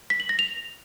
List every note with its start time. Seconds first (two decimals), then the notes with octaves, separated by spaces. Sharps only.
0.10 B6
0.20 F#7
0.29 A#6
0.39 F7